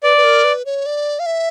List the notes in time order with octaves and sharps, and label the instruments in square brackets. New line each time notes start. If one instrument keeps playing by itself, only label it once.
[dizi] B4 [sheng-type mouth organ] D5
[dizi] B4
A#4
B4
C#5
D5
F5
E5